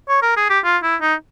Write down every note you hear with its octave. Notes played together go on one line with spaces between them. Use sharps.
C#5
A#4
G#4
G4
F4
E4
D#4